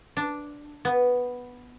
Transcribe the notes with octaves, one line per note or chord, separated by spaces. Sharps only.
D4
B3